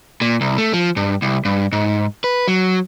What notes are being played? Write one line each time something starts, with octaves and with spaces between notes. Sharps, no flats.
A#2
C2
A3
F3
G2
C2
G2
G#2
B4
F#3